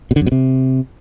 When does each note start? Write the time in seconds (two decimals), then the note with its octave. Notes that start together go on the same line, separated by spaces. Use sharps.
0.11 B2
0.16 D3
0.21 F#2
0.26 B2
0.32 C3